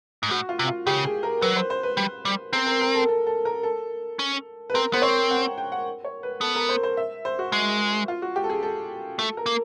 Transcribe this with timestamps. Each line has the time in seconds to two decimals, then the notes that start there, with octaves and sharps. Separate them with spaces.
0.23 G#2
0.30 A2 F#4
0.49 F4
0.59 C3
0.68 F4
0.87 C#3 G4
1.05 G#4
1.23 A#4
1.41 F#3 B4
1.56 C5
1.70 C5
1.83 B4
1.97 G3
2.25 G3
2.53 C4 A#4
2.66 A#4
2.81 A#4
2.95 A4
3.08 A4
3.27 A4
3.45 A#4
3.63 A4
4.19 C#4
4.70 B4
4.74 C4 A#4
4.93 B3 C5
5.02 C4 C#5
5.31 F#5
5.45 G5
5.58 G5
5.72 F#5
6.05 C#5
6.23 B4
6.41 B3 A4
6.55 A#4
6.69 C5
6.83 C5
6.97 E5
7.25 C5
7.39 F#4
7.52 G#3
8.08 F4
8.22 F#4
8.36 G4
8.44 A4
8.50 G#4
8.63 A4
9.19 A3 A4
9.37 A#4
9.46 A#3